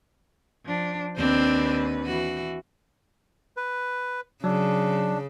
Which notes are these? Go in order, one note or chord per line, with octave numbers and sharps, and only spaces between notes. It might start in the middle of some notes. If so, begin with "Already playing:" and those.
F3 D4
D#2 C4 D4 B4 C5
E3 F#4
B4
C#3 F#3 D4